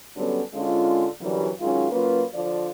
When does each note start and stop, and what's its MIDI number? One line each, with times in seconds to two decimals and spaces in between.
0.16 0.41 50
0.16 0.41 54
0.16 0.41 55
0.16 0.41 59
0.16 0.41 61
0.16 0.41 69
0.54 1.06 50
0.54 1.06 56
0.54 1.06 61
0.54 1.06 65
1.20 1.49 42
1.20 1.49 50
1.20 1.49 52
1.20 1.49 54
1.20 1.49 55
1.60 1.86 51
1.60 1.86 54
1.60 1.86 56
1.60 1.86 61
1.60 1.86 65
1.91 2.23 54
1.91 2.23 58
1.91 2.23 61
1.91 2.23 65
1.91 2.23 71
2.34 2.69 50
2.34 2.69 53
2.34 2.69 65
2.34 2.69 74